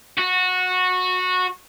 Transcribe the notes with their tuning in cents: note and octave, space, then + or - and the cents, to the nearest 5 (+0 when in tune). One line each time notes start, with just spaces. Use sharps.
F#4 -15